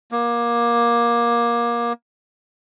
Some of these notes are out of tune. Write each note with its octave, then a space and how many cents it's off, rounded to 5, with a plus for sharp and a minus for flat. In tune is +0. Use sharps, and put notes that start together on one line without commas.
A#3 +20